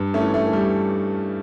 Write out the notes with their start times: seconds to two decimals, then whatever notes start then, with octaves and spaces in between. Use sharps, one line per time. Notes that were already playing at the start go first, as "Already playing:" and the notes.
Already playing: G2
0.14 A3 C#4
0.20 E3
0.34 A3
0.46 E3
0.53 G3